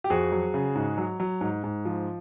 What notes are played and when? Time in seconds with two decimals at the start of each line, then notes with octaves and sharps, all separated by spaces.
0.04 G4
0.10 F2 F#4 G#4
0.32 F#3
0.54 C#3
0.75 G#2
0.98 F#3
1.20 F#3
1.41 G#2
1.64 G#2
1.85 F3